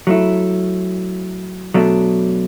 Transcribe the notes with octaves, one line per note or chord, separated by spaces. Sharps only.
F#3 A3 E4
B2 F#3 A3 D4